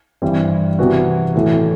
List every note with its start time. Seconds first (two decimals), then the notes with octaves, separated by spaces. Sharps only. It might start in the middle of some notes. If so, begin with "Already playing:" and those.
0.22 G2 E3 G3 C4
0.79 C3 E3 B3 F#4
1.35 A2 E3 A3